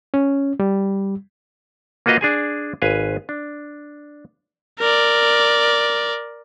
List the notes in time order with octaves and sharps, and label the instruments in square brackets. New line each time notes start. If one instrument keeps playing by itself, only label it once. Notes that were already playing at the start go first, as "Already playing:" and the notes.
[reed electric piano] C#4
G3
[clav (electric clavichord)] A#3 F4 F#4 B4 D#5 F5
D4 G#4 G#5
G#1 B4 F5 G#5
D4
[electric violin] A#4 D5